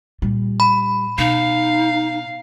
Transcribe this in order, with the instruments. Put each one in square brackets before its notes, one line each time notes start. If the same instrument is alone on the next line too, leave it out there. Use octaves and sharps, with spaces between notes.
[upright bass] A#2 G3
[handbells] B5
[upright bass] B2 [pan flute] D#4 [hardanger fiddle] F5